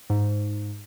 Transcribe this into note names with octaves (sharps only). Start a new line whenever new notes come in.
G#2